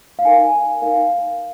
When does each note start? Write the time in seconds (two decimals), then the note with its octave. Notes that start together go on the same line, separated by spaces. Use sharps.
0.19 F5
0.25 D#4 A#4 G#5
0.82 D#4 A#4 F5